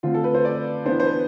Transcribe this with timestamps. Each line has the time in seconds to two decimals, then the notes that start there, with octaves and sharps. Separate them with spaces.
0.03 D3 A3 C4 F4
0.14 A4
0.24 B4
0.34 C5
0.45 D5
0.86 E3 B3 D4 C5
1.00 C5
1.06 B4